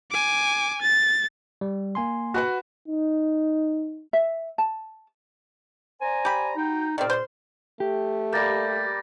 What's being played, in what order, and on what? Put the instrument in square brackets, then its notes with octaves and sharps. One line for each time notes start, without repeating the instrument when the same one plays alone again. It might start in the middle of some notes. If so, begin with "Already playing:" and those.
[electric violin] G#5 D6
A6
[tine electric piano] G3
A#3 G#5 C6
[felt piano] F#4 B4 F#5
[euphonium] D#4
[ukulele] E5
A5
[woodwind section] C5 D5 A#5 [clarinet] G#5
[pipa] G4 B5
[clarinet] D#4 [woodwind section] F#4 G5
[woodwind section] C#2 A#2 F6 [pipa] D#3 C4 [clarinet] D5
[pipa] C5 C6
[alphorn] A3 [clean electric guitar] G4
[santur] G3 A#3 [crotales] G6 A6 A#6